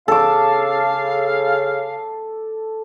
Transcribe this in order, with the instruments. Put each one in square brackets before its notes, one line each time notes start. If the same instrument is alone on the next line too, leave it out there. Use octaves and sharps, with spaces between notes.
[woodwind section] C#3 F5 [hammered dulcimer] A4 D6